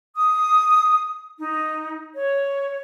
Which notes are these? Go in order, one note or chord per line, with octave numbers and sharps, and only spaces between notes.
D#6
D#4
C#5